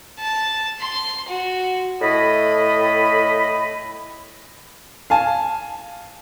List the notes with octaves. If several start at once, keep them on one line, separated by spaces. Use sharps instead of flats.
A5
C6
F#4
A2 D#5 B5
F5 G#5 A5